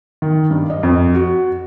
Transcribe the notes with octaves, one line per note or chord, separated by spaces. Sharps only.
D#3
G2
D#5
F2
F#4